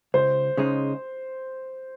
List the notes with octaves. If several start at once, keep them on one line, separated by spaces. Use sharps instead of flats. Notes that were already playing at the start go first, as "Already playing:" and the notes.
C#2 C5
C#3 G#3 D#4